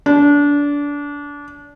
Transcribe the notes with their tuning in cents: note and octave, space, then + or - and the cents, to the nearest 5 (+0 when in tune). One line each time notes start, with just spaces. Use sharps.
D4 -25